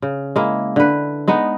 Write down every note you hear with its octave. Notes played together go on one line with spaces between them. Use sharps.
C#3
G#3 A#3 E4
D3 B4
G#3 B3 D#4